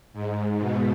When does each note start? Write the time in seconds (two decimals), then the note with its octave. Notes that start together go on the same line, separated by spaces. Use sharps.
0.13 G#2
0.60 B2